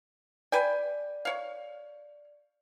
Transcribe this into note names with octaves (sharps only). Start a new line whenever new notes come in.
B4 D5 G5 G#5 G6
C#5 F5